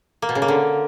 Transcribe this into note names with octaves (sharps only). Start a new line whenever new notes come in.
A#3
B2
C#3
A#3
D3